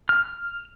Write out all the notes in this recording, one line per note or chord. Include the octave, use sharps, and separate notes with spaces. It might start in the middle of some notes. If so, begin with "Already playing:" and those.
F6